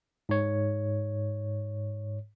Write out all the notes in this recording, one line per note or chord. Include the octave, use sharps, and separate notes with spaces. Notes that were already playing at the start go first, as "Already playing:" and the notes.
G#2 C#5